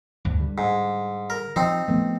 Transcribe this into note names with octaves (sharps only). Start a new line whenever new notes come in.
D2 G2
D3 G3
G#2
A#4
F3 C4 D#4
F3 A3 B3